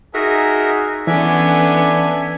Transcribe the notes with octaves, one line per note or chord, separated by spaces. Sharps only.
D#4 F#4 G#4 A#4 E5
D3 E3 B3 C#4 D4 E5 G#5